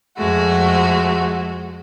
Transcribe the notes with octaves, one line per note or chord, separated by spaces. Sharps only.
F2 G#3 A3 F#4